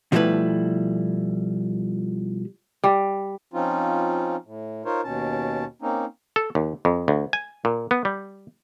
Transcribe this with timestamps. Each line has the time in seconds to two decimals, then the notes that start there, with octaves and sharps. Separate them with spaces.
0.12 B2 F3 G3 A3 E4 B4
2.84 G3
3.54 F3 C4 C#4 D#4 F4
4.46 A2
4.85 D#4 F4 A#4 C5 C#5
5.04 D#2 B2 C#4 A5
5.82 A#3 C4 C#4 D#4
6.36 A4
6.55 D#2
6.85 F2
7.08 D2
7.33 G#5
7.65 A#2
7.91 B3
8.05 G3